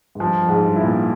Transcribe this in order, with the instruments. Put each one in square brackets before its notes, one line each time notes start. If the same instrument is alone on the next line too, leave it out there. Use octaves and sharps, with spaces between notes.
[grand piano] G#2
[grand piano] G2 [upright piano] F3
[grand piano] F2
[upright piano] G#2
[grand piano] G2
[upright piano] E4
[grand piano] A#2